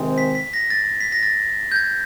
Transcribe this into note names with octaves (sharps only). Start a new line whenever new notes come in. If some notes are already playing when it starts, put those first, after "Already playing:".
Already playing: C3 D#3 G#3 C4
B6
B6
A#6
A6
B6
A#6
A6
G6
G#6